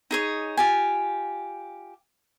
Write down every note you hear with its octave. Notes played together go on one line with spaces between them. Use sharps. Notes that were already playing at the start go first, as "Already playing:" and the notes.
D#4 G#4 C#5
F4 G4 G#5